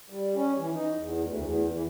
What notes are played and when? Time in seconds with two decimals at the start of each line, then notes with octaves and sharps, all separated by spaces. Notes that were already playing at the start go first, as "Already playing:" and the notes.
0.10 G3
0.35 C#4
0.58 E3
0.73 D#4
0.96 E2
1.24 D2
1.42 E2
1.73 E3